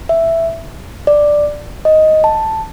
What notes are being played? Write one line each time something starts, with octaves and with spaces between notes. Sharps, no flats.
E5
D5
D#5
A5